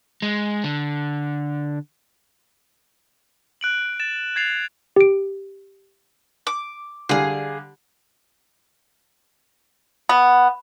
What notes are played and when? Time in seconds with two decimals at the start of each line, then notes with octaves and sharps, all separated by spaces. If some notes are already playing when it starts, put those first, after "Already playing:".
0.22 G#3
0.64 D3
3.61 F#6 D7 F#7
4.00 A6 E7
4.36 G#6 A6 C7 F7
4.96 G4 D7
6.47 D6
7.09 D3 G3 G#4 F5
10.09 B3